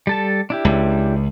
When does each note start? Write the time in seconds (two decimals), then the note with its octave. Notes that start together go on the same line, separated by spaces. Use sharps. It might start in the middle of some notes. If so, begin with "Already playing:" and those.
0.07 G3 A4 A5
0.50 D4 E4 G4
0.65 C#2